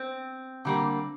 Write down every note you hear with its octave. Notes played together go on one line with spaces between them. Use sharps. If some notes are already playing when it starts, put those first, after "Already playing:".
Already playing: C4
D3 G3 A#3